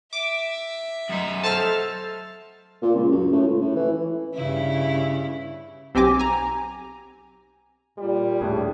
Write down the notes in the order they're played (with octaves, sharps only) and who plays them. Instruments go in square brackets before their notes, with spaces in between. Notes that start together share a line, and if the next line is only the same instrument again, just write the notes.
[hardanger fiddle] E5 [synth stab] D6
[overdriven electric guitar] F#2 D#4
[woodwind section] A4 C5 [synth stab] A5 F6
[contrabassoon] A#2
C#2
F#2
A2
C#2
A2
E3
[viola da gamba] G2 C#3 E4
[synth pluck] B1 C4 G4 G#5 D6 A#6
G#5 A#5
[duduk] A#2 [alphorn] G3
[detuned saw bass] D#1 [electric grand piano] A2 G#4 [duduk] D4